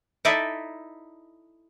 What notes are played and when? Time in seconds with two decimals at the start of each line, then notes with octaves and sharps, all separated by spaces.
0.25 D#4 E4 A4 D5 E5